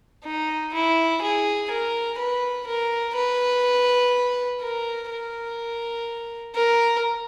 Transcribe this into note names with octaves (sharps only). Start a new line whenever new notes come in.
D#4
E4
G#4
A#4
B4
A#4
B4
A#4
A#4
A#4